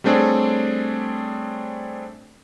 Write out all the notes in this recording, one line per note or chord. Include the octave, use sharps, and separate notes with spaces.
G3 A3 C4 D4 G#4 C#5